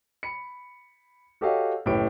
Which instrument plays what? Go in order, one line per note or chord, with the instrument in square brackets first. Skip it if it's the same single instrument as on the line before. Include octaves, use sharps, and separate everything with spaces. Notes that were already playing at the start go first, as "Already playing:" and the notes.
[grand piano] B5 C#7
F#4 G4 A4 C#5 D#5 F5
F#1 A2 G4 B4 D7